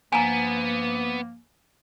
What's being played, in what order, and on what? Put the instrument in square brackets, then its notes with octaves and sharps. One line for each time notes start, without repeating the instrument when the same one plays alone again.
[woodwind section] G2 F3 A#3 [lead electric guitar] B3 [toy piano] G#5 A#5